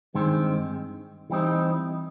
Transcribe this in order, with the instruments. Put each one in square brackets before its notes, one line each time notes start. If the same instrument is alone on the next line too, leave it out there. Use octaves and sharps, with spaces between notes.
[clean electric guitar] G2 D#3 G#3 C4
E3 G3 C4 D#4